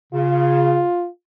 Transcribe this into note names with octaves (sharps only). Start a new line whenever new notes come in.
C#3 F4